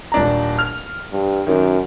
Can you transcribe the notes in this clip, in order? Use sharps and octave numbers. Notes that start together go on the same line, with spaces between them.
D#1 D4 A#5
F6
G2
F#2 D#3